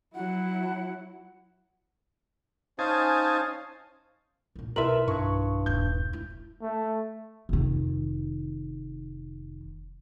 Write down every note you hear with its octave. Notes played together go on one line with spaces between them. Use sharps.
F#3 E4 F#5
C#4 D#4 C5 F5 G#5 A5
A1 A#2
B1 E4 A#4 B4 E5 C6 F#7
G2 C#6
D#1 G6
E4
A3
F1 D#3